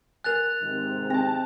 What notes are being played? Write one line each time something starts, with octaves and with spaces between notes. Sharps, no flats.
A#4 G#5 F#6 A6 F7
G#2 C3 D#3
C4 G5 A5 A#6